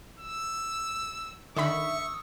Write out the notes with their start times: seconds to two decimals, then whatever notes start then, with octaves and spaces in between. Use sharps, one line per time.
0.20 E6
1.56 D3 D#3 E5 B5 C#6 D#6 E6